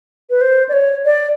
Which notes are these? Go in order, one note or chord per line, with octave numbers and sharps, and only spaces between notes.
B4
C5
D5
C#5
D5